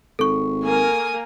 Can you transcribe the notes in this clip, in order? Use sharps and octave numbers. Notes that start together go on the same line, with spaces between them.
G#1 A4 C#6
A#3 A#4 G#5 D#6